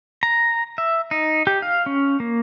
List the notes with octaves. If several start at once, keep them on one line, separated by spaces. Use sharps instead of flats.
A#5
E5
D#4
G4
F5
C#4
A#3